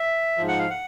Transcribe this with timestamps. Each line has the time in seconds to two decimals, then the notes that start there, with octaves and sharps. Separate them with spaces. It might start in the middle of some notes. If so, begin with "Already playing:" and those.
Already playing: E5
0.38 G#2 F3
0.48 F#5
0.59 F5
0.70 F#5